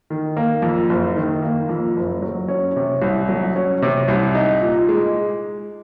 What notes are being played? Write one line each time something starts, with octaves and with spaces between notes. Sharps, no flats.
D#3
A#3
F2
F#1
D#3
A#3
F2
F#1
F#3
C#4
C3
C2
F#3
C#4
C3
C2
D#4
A#2
G#3